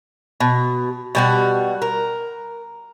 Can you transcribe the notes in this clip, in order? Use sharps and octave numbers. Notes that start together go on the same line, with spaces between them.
B2
B2 G3 F#4
A#4